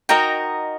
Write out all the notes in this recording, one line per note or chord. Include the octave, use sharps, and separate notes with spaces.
D#4 F#4 A#4 D#5 G5